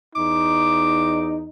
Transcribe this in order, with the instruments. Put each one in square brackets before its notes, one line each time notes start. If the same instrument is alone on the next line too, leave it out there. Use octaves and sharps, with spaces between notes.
[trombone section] E2 D#4 [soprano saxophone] D6